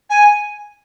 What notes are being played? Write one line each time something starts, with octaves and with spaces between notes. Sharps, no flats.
G#5